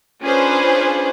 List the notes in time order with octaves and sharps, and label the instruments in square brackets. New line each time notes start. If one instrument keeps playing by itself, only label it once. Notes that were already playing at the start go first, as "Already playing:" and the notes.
[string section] C#4 D4 F4 G#4 B4 C5